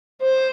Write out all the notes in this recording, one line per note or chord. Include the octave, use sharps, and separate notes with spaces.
C5